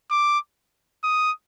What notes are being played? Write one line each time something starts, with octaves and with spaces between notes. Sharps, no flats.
D6
D#6